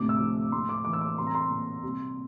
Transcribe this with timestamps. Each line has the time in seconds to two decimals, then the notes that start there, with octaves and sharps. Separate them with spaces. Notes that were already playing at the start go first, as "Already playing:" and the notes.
Already playing: D2 A2 C3 D6
0.09 E6
0.20 F3
0.52 A2 C6
0.69 D6
0.85 E3 D6
0.93 E6
1.01 D6
1.17 C2 C6
1.27 A#5
1.35 C6
1.50 A#2
1.83 C2